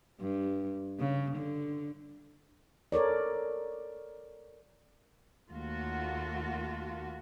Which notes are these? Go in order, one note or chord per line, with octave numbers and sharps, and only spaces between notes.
G2
C#3
D3
A4 A#4 C#5 D5
D#2 A3 A#3 F4 F#4